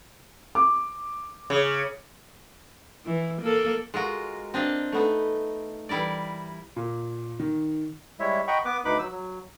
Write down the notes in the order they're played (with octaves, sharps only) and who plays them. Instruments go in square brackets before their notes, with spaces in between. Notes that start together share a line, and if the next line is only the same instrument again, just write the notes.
[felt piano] D6
[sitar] C#3
[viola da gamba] E3
A#3 A4
[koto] G#3 F4 F#4 A#4
C4 D4 D#5 F5
A3 B3 D#4
E3 G3 E4 A#4 D5
[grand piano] A#2
D#3
[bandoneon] G3 G#3 E4 C#5 E5
D#5 F#5 G5 A#5 B5 C#6
B3 B4 D6
D2 D#4 B4 B5 D6
F#3 E6
F#3